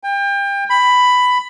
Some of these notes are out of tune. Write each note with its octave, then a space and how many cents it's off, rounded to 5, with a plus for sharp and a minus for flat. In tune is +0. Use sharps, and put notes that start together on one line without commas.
G5 +30
B5 +10